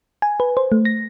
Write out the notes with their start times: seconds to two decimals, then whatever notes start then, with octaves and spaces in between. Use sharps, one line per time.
0.22 G#5
0.40 B4
0.57 C5
0.72 A3
0.85 A#6